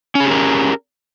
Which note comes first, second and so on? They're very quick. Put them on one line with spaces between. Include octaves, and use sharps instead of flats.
C#4 G#4 G4 A#4